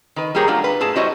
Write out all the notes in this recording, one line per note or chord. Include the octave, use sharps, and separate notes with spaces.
D#3 B4
G3 A#3 G4 G#4 A#4 C#5
F#3 A3 D4 F4
B4
A2 G#4 A5
G3 E4 F#4 C5 C#5 D#5